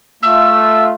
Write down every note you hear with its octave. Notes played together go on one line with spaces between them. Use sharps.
A3 F4 E6